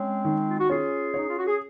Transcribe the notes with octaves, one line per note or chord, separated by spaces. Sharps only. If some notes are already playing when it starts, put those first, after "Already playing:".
Already playing: G#3 C4 C#4
D#3
F4
F#4
C#4 F4 G#4
D#4 C#5
F4
F#4
G#4